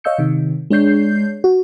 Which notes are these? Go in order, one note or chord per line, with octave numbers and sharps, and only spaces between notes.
C#5 D#5 F5 E6 G6 C#7
C3 D#3
G#3 D4 C#5 G6 C7
F#4